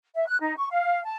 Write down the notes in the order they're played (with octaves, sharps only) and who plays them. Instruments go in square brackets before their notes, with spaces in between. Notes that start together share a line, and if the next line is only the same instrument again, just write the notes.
[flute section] E5
F#6
D#4
C#6
F5
A5